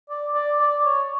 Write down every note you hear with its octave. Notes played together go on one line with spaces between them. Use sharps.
D5
D5
D5
C#5